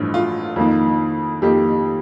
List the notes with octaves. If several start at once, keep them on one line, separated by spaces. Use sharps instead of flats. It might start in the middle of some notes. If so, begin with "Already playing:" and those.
Already playing: A1 G2 F3
F4
F2 D#3 A#3
F2 D#3 A#3 G4